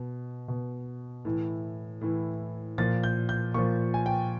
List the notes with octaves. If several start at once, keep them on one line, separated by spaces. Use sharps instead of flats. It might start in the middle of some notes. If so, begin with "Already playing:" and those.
Already playing: B2
B2
A2 E3
A2 E3
A#2 F3 A6
G6
G6
A#2 F3 C#6
G#5
G5